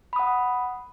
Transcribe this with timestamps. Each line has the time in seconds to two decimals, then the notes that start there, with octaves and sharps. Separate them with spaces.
0.13 B5
0.16 D#6
0.19 F#5